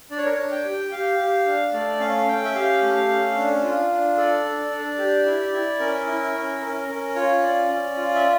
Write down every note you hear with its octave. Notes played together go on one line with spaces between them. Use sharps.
D4 D5
C#5
A#4
D4 C#5
G5
G4
G4 F5
G4
D4
A3 D5
C#4 F5
C#4 G5
E5
G4 F5
A3
C#4
D4
F4
D4
A4 D5
D4
D4
G4
E4
E4
C#4 A#4
E4
C#4
C#4 A#4
C#4 A#4
F4 C#5
C#4 D5
C#4
F4
E5